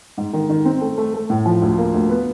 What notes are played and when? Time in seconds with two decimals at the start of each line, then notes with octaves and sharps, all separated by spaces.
0.18 G#2
0.33 D#3
0.49 D#3
0.65 C4
0.81 A3
0.98 A3
1.14 A3
1.30 A2
1.45 F3
1.62 D2
1.78 A#3
1.94 D2
2.09 B3